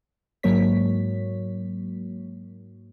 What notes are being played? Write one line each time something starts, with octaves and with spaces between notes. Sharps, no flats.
G#2 F#3 A#3 C#5 B6